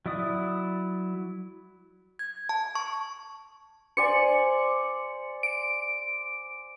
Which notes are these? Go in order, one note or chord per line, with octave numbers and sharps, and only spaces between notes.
F#3 E4 D5 D#6
G#6
A5
C#6
C5 D5 G#5 C#7
D7